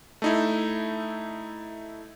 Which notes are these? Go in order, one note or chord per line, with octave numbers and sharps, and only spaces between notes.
A3 D#4 E4